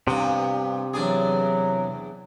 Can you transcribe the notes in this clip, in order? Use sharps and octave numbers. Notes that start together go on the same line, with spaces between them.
G2 C3 B3
E2 F#3 D4 G#4